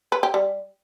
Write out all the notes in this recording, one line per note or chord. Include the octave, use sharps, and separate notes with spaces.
B4
G4
G3